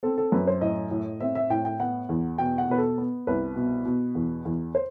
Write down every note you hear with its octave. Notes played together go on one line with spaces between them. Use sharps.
C4 A4
A4
F#2 B4
C5
A2 D#5
A2
C4 E5
E5
A2 G5
G5
B3 F#5
E2
B2 G5
F#5
B2 B4
A4
B3
C2 B4
B2
B2
E2
E2
C5